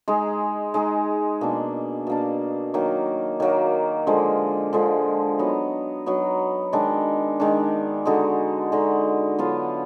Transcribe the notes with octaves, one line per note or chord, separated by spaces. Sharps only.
G#3 D#4 G#4
G#3 D#4 G#4
B2 A#3 D4
B2 A#3 D4
D#3 F#3 A#3
D#3 F#3 A#3
D3 F3 G#3
D3 F3 G#3
F#3 B3 D#4
F#3 B3 D#4
D#3 G#3 D4
D#3 G#3 D4
D3 G#3 D#4 F#4
D3 G#3 D#4 F#4
D3 F#3 B3 F4